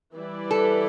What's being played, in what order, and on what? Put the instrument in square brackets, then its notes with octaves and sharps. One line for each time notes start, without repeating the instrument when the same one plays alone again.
[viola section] E3 G3 E4 B4 D5
[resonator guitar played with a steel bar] A4